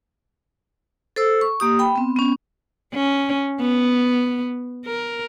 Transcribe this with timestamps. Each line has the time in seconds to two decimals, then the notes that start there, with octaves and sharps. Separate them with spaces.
1.16 A4 C5 E6
1.41 C#6
1.60 A#3 G4 D#6
1.79 G5 B5
1.96 B3 C4
2.16 B3 C#4
2.94 C#4
3.60 B3
4.86 A#4